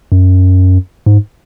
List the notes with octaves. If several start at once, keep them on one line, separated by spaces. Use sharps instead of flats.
F#2
G#2